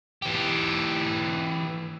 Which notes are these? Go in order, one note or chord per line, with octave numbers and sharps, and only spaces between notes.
E3 G4